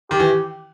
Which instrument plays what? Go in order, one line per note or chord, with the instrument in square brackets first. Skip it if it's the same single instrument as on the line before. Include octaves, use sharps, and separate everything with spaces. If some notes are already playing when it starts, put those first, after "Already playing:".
[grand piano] D#3 [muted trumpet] G4
[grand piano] E3